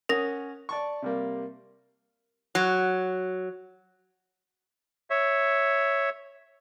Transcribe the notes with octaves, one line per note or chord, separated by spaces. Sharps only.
C#4 A#4 F#5 D#6 A#6
D5 A5 C#6
C3 G3 A#3
F#3
C#5 E5